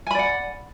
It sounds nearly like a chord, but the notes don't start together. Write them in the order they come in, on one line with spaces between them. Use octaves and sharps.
G#5 B5 D5 F#5